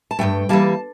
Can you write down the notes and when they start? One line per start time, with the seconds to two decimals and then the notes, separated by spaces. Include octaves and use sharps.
0.11 A5
0.19 G2 E3 A3 G5
0.49 E3 G3 A#3 A5